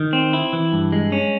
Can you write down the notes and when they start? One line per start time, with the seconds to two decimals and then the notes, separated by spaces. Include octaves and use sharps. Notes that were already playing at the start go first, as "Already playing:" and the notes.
Already playing: D#3
0.13 C4
0.33 E4
0.53 E3
0.73 G2
0.92 G#3
1.12 C#4